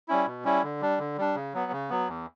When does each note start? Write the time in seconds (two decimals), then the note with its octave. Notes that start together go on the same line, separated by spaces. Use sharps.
0.08 G3 C#4 E4
0.26 B2
0.45 G3 C#4 E4
0.63 D3
0.81 G3 D4
0.99 D3
1.18 G3 D4
1.35 C#3
1.54 F#3 B3
1.72 C#3
1.90 F#3 B3
2.08 E2